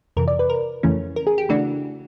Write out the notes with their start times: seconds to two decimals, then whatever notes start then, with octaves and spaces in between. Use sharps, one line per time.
0.17 F2 C3 E3 A#4
0.28 D5
0.39 B4
0.50 A#4
0.83 F2 C#3 E3 A3 C#4
1.16 A#4
1.27 G#4
1.38 G4
1.49 C#3 E3 A3 D4 F#4